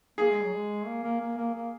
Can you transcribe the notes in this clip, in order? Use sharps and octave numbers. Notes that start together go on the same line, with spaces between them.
A#3 G#4
G#3
F#3
G#3
A#3
A#3
A#3
A#3
A#3